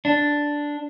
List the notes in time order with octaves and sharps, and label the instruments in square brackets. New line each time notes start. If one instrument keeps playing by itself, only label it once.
[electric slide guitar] D4